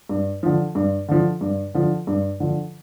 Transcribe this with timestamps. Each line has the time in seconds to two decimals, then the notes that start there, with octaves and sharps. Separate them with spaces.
0.09 G2
0.43 D3 F3
0.75 G2
1.08 D3 F3
1.41 G2
1.74 D3 F3
2.07 G2
2.40 D3 F3